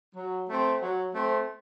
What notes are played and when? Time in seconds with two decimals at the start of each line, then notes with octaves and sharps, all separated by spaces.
0.15 F#3
0.48 A3 C4
0.80 F#3
1.13 A3 C4